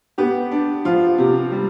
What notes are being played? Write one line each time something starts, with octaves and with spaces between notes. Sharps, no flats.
B3 G4
D4
F3 F4
C3
G3